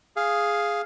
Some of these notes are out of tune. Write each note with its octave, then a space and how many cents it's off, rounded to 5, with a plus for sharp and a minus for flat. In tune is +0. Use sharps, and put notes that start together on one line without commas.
G#4 +0 F5 +0